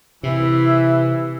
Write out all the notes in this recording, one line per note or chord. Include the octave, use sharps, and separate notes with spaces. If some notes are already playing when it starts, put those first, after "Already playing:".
C3 E3 E4